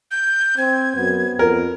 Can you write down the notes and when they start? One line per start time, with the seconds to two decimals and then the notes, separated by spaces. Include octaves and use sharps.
0.11 G6
0.58 C4 G#6
0.96 F#2 B3
1.39 F2 A#4